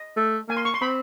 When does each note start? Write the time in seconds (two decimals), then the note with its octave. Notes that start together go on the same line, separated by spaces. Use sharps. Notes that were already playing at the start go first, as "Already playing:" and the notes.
Already playing: D#5
0.17 A3
0.49 A#3 G#5
0.57 C6
0.65 C#6
0.74 C6
0.81 C4 B5